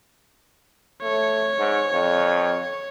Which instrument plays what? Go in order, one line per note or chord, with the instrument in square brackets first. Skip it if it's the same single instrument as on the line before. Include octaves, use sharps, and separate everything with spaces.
[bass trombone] A3 [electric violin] C#5
[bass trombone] G#2
F2